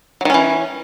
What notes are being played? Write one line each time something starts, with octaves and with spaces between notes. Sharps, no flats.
D#3 E3 F#3 C#4